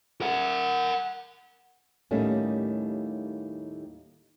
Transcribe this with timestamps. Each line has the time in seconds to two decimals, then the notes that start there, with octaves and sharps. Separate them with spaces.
0.21 A#4 F#5
2.11 D#2 A2 D#3 G3 A3 C#4